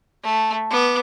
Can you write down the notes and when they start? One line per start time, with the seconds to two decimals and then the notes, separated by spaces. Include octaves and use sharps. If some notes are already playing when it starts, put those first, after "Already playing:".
0.23 A3
0.70 B3 D6